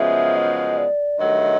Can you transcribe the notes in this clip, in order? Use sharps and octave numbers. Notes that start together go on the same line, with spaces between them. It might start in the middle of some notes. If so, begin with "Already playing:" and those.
Already playing: F#2 C#3 F3 G#3 B3 E5
D#5
D5
G2 D#3 F#3 A3 D#5